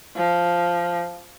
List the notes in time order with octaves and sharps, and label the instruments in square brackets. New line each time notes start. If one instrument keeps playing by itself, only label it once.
[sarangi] F3